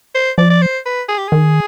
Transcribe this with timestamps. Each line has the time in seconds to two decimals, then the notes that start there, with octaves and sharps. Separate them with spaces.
0.15 C5
0.38 F3 D5
0.50 D5
0.62 C5
0.86 B4
1.09 G#4
1.18 G4
1.28 D#3 G#4